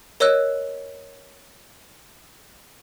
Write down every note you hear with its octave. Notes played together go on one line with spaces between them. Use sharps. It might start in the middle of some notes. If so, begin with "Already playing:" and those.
A#4 C#5 D#5 E6 F#6